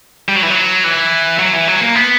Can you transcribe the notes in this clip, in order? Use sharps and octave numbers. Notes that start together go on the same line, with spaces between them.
G3
F#3
E3
F#3
E3
F#3
E3
F#3
A#3
B3